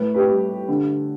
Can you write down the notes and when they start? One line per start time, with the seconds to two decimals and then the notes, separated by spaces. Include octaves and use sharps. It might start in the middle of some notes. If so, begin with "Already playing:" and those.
Already playing: A2 B4
0.14 G4 B4
0.28 G3
0.69 D3